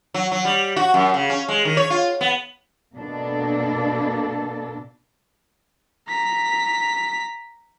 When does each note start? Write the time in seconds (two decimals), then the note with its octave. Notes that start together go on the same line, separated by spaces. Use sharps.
0.14 F#3
0.32 F#3
0.45 G3
0.76 F#4
0.94 F#2
1.14 C#3
1.30 C#4
1.48 G#3
1.65 D#3
1.77 C#5
1.90 F4
2.21 B3
2.95 B2 A#3 D4 A4
6.09 A#5 B6